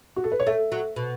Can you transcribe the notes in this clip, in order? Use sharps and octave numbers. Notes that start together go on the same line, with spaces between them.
F#4
A4
B4
C#5
A3 E5
F#3
B2